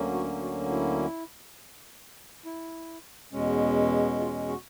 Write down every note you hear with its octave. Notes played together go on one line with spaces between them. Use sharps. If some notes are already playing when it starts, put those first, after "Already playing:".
Already playing: D2 D3 F#3 A#3 C#4
F#4
F#4
E4
E4
E2 B2 G#3 C#4
F4
F#4